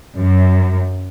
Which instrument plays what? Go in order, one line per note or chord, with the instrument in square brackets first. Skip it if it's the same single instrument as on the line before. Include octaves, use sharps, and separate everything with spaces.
[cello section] F#2